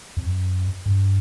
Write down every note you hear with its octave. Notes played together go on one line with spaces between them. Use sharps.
F2
F#2
G2